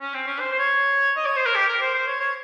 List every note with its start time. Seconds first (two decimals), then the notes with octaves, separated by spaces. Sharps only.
0.01 C#4
0.14 C4
0.27 C#4
0.39 C5
0.52 C5
0.59 C#5
1.17 D#5
1.26 C#5
1.36 C5
1.46 A#4
1.55 G4
1.68 A#4
1.81 C5
1.94 C5
2.07 C#5
2.20 C#5